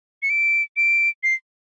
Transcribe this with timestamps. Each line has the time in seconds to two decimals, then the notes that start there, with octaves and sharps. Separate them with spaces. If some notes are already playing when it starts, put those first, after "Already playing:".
0.23 C#7
0.30 D7
0.77 D7
1.23 C7